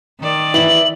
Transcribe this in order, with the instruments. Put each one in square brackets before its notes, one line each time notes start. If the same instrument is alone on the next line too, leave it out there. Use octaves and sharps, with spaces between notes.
[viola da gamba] D#3 D5
[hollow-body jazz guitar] E3 [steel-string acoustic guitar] E4 E5 [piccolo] F#7